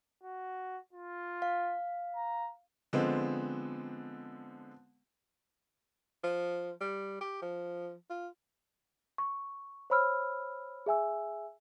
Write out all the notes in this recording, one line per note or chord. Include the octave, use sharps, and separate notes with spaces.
F#4
F4
F5
A#5
D3 F3 G#3 B3 C4
F3
G3
G4
F3
F4
C#6
C5 C#5 B5 E6 F6
G#4 E5 G#5 E6